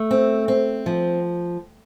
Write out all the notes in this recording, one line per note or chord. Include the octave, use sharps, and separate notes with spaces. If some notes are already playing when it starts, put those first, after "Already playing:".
Already playing: A3
C4
C4
F3